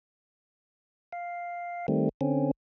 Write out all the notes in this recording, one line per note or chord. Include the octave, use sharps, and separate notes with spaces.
F5
D#3 G3 A3 C4
D3 C4 C#4